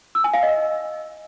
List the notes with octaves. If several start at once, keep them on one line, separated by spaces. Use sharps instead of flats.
E6
G#5
F5
D#5